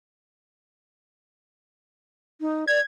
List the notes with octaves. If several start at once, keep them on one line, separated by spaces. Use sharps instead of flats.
D#4
D5 G#6